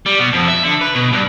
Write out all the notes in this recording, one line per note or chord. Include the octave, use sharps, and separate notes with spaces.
G3
B2
F2
E5
D3
B4
B2
G2